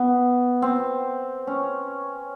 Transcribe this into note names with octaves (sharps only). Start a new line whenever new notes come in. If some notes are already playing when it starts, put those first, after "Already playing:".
Already playing: B3
C4
C#4